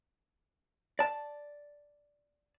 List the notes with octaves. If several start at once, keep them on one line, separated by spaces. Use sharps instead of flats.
D5 A5